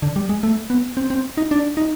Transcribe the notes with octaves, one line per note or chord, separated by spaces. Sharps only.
D3
G3
G#3
A3
B3
C4
C4
D#4
D4
D#4